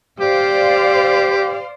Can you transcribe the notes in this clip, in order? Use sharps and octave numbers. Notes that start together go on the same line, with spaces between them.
G4 C5 D5 F5